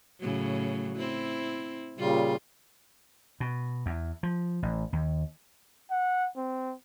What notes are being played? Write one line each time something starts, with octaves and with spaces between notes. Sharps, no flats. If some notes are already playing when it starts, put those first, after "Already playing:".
A2 C#3 F#3
C4 E4
A#2 C#3 G3 F4
B2
E2
F3
A1
D#2
F#5
C4